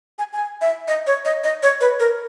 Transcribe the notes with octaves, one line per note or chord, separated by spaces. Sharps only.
G#5
G#5
E5
D#5
C#5
D#5
D#5
C#5
B4
A#4